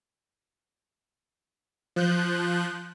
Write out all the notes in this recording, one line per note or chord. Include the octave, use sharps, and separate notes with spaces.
F3 F#6 G6